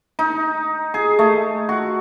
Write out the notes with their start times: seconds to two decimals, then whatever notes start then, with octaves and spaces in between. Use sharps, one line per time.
0.19 D#4
0.94 G#4
1.19 A3
1.69 F#4